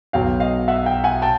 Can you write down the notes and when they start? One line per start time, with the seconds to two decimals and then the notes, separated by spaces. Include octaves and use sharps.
0.13 B1 B2 F#3 F5 G5
0.40 D#5 F5
0.68 E5 F#5
0.86 F5 G5
1.04 F#5 G#5
1.22 G5 A5